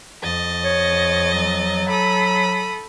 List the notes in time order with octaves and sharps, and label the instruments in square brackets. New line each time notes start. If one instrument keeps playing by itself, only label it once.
[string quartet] F2 D#5 A6
[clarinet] C#5
F#3
[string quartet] A4 B5 D#6